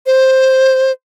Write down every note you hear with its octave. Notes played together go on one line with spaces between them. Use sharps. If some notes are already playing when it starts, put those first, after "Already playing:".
C5